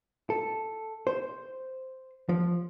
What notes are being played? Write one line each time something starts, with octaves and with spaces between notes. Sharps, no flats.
A4
C5
F3